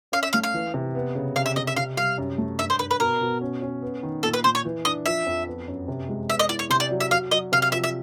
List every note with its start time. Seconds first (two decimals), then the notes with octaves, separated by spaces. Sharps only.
0.12 C#4 F5
0.23 E5
0.33 A3 F5
0.43 F5
0.54 E3
0.74 C3
0.95 B3
1.15 C#3
1.36 C3 F5
1.46 E5
1.56 C3 D#5
1.67 E5
1.76 C3 F5
1.97 G3 F5
2.18 F#2
2.38 A3
2.59 G2 E5
2.70 C5
2.79 G2 B4
2.91 B4
3.00 B2 A#4
3.21 B2
3.41 C#4
3.62 C#4
3.82 B3
4.03 D#3
4.23 A#2 A4
4.34 B4
4.44 A#2 C5
4.55 C#5
4.65 E3
4.85 D4 D#5
5.06 F3 E5
5.26 F2
5.47 B3
5.68 F#2
5.88 C3
6.09 G#3
6.30 B3 E5
6.39 D#5
6.49 E4 D5
6.59 C#5
6.70 C3 C5
6.80 D5
6.91 F#3
7.00 E5
7.11 F#3 F5
7.31 F#3 D#5
7.52 C3 F5
7.62 F5
7.72 F3 E5
7.84 E5